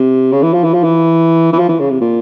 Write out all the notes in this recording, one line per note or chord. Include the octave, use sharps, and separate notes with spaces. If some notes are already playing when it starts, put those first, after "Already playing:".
Already playing: C3
C#3
E3
F3
E3
F3
E3
E3
F3
E3
C#3
C3
A#2